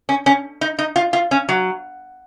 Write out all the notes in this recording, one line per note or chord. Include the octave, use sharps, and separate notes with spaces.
C#4
C#4
D#4
D#4
F4
F4
C#4
F#3